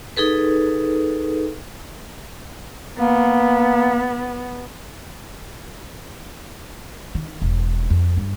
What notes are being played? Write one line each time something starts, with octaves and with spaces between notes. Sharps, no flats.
D#4 G#4 A4 B4
A#3 B3
D#3
E1
F2
G2